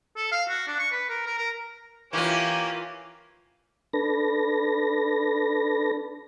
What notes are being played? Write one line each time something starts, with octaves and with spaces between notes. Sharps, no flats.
A4
F5
F#4
D4
C#6
B4
A#4
A#4
A#4
E3 A#3 C#4 F4 G4
D4 A4 B4 A#6